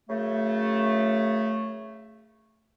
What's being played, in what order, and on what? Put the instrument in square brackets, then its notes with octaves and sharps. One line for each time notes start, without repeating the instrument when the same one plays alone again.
[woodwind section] F#2 C#3 A3